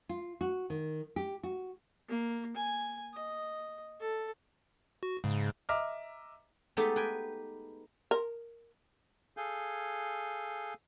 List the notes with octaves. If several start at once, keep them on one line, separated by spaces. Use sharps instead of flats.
F4
F#4
D#3
G4
F#4
A#3
G#5
D#5
A4
F#4
G#2 C#3
D#5 E5 A#5 D6 F6
G#3 A3 B3 D#4 G4 A4
B4 G5 G#5
A#4
G#4 A4 F5 G#5 G6